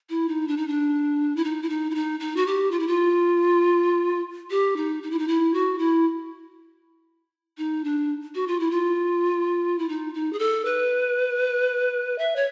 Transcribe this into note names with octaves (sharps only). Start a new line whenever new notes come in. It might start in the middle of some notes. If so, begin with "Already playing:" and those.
E4
D#4
D4
D#4
D4
E4
D#4
E4
D#4
E4
D#4
D#4
F#4
G4
F4
E4
F4
G4
D#4
D#4
E4
D#4
E4
F#4
E4
D#4
D4
F#4
F4
E4
F4
E4
D#4
D#4
G#4
A4
B4
E5
C#5